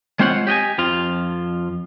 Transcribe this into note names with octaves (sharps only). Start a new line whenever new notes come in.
G#3 C4 F4 C5 C#5 F#5
G4 D#5 G5 G#5
F2 F3 F4